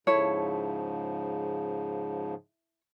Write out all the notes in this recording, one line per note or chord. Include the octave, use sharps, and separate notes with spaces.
G#2 C#3 F3 E4 A4 C#5